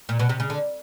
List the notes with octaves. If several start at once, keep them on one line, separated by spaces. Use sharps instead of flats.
A#2
B2
C3
C#3
D3